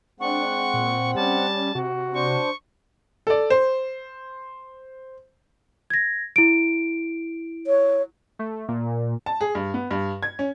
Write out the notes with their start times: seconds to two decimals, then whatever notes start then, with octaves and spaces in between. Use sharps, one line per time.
0.20 G#3 C4 D4 F#5 C#6
0.74 A#2
1.16 G3 C#4 A5
1.75 C3 F#4
2.14 D4 C5 C#6
3.27 A4 D5
3.50 C5
5.90 G#6 A#6
6.36 E4 D7
7.67 C#5
8.39 A3
8.68 A#2
9.26 A5
9.41 G#4
9.55 G2
9.74 B3
9.91 G2
10.23 G#6
10.39 C#4